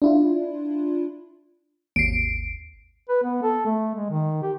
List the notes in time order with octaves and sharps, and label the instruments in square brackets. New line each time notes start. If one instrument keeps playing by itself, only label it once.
[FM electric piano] D4 E4 F4
[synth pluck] G#1 D#2 [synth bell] C7 D7
[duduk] B4
B3
A4
A3
G#3
D#3
G4